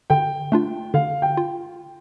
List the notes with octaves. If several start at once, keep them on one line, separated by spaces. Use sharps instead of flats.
D3 G5
A3 D4 F4
D3 F5
G5
F4